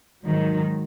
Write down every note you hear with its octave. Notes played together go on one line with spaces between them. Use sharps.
G#2 D#3 F#3